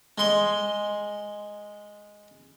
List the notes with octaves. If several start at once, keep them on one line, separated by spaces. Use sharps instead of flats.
G#3 C6